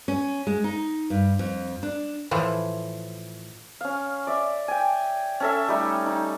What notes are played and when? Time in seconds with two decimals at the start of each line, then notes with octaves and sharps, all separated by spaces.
0.08 C#4
0.47 G#3
0.64 D#4
1.10 G2
1.39 F2
1.83 D4
2.31 A2 E3 F3
3.81 C#4 F5
4.27 D5 E5
4.68 G5 G#5
5.40 C#4 A4 E5
5.68 G3 A3 D#4 A4
6.06 D#4